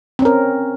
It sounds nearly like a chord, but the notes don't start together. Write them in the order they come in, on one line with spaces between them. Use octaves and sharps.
C4 C#4 A#4